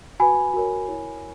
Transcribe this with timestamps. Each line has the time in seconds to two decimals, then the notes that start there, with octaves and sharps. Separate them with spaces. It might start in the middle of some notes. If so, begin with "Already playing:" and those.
0.20 F#4 B4 G#5 B5
0.54 F#4 A#4 C#5
0.88 E4 A#4 C#5